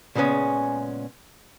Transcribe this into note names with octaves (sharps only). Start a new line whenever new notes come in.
A#2 C#3 G#3 B3 C#4